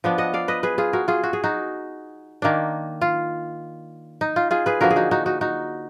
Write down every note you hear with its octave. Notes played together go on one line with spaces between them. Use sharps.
F3 B3 D4
D#5 F#5
D5 F5
B4 D#5
G#4 B4
F4 G#4
F#4 A#4
F4 G#4
F#4
G#4
D#4 F#4
D#3 A#3 D4
F4
D#4
F4
F4 G#4
G#4 B4
D3 F3 A#3 F#4 A#4
G#4
D#4 F#4
D#4 F#4
D#4 F#4
D#4 F#4